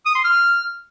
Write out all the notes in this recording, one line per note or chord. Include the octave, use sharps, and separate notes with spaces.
D#6
C6
F6